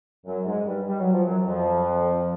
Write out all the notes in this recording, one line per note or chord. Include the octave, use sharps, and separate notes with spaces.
F#2 F#3
G#2 G#3
G2 G3
G3
F#3
F3
F#2 F#3
F2 F3